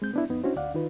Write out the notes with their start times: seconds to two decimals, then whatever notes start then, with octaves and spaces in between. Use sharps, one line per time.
0.02 G#3 C4 G6
0.14 B3 D4 E4
0.29 F2 B3 D#4
0.44 C#4 D4 E4 F#4 C5
0.56 D2 D5 F5 F#5
0.74 D#3 D#4 F4 B4